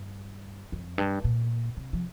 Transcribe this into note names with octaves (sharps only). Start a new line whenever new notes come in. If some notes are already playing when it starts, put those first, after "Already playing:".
Already playing: G2
F2
G2
A#2
C3
F3